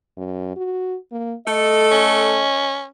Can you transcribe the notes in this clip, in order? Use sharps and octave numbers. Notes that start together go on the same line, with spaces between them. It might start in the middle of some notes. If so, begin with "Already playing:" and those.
F#2
F#4
A#3
A3 A4 D#5
C#4